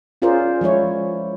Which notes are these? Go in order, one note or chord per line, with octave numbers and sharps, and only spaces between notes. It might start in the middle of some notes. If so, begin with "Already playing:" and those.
C#4 F4 G#4 A#4 C5 D5
F3 G#3 E4 C#5